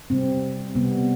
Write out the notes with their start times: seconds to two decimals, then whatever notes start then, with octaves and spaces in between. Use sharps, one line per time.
0.10 C3 G3 C4
0.75 C3 G3 B3